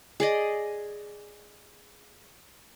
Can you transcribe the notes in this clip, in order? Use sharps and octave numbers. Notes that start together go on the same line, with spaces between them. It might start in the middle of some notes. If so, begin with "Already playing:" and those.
G#4 D5 D#5